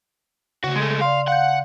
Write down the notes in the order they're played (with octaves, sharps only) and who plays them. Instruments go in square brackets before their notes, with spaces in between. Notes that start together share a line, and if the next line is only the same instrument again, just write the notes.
[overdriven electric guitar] D2 F#4 [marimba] C#3
[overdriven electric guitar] G#3 A3
[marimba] D5 C6 [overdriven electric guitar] F5
[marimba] F5 G6 [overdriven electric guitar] F#5